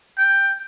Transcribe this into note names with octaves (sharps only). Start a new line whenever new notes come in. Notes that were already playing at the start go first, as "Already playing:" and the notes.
G5